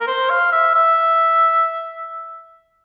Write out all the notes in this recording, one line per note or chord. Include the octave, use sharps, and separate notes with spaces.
A#4
C5
F5
E5
E5